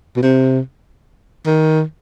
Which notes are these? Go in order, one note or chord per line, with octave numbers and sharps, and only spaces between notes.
B2
C3
D#3